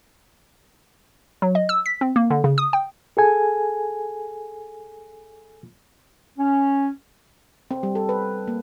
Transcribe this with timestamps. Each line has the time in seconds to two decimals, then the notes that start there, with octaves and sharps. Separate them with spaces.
1.42 F#3
1.55 D#5
1.69 E6
1.86 B6
2.01 C4
2.16 A#3
2.30 D3
2.44 C#3
2.58 D#6
2.73 G5
3.17 G#4 A4 G#5
6.39 C#4
7.71 C4
7.83 G3
7.95 A4
8.09 B4
8.48 A#3